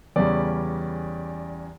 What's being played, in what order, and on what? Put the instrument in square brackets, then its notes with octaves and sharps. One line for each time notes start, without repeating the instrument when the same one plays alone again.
[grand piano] E2 C#3 G3 C#4 D5